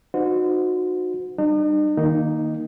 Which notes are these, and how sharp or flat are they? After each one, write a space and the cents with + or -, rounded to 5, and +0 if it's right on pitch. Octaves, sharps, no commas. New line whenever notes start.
D#4 -30 F#4 -25 C5 -35
G3 +0 D#4 -45
D#3 +5 A#3 +0 D#4 +0